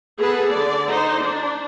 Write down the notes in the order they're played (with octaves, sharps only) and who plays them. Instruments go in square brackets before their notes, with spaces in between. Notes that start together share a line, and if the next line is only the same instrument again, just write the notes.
[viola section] B3 G#4 A4 B4
D3 D5
D#4 C5
D4